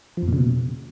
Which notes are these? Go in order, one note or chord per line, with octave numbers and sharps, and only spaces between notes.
F3
F2
A#2
C#3
B2